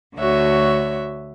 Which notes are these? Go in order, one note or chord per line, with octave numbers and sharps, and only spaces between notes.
D2 D3 F#4 C#5 E5